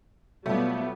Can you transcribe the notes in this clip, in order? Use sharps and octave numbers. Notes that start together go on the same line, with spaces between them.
B2 F#3 G3 A3 B3 F4